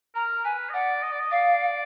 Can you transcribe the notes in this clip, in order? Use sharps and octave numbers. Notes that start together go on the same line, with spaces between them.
A#4 A#5
B4 G#5
D#5
D5 F#5
D#5
D5
D#5
D5 F5